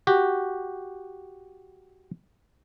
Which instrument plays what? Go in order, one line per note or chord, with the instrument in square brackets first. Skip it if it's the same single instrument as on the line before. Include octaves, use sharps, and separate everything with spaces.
[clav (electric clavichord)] F#4 G4